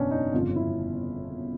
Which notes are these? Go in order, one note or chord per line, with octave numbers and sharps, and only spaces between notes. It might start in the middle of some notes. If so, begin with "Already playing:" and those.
Already playing: F#1 E2 B2 C#4 D4
D#4
G1 F2 C#3 F4
E4